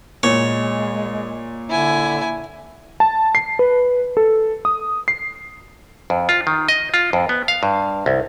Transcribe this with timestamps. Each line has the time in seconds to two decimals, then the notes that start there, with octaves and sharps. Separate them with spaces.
0.23 A#2 G#3 C#5
1.69 D3 E4 G#5
3.00 A5
3.35 C7
3.59 B4
4.17 A4
4.65 D#6
5.08 C7
6.10 F2
6.29 F4
6.47 D#3
6.69 D#5
6.94 F4
7.13 F2
7.29 B3
7.48 F5
7.63 G2
8.06 C2